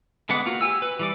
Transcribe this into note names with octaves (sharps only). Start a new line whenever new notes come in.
D3 G#3 B3 F#5 D6
A#3 F4 F#4
G4 G#5 E6
B4
E3 G3 D6